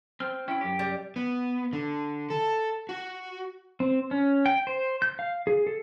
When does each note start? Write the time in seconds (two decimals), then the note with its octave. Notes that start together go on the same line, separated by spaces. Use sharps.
0.20 C4 F6
0.48 C#4 E4 G5 D7
0.61 F#2 G4
0.79 G3
1.16 B3
1.73 D3
2.30 A4
2.89 F#4
3.80 C4
4.11 C#4
4.46 G5
4.67 C5
5.02 G6
5.19 F5
5.47 G#4
5.67 A4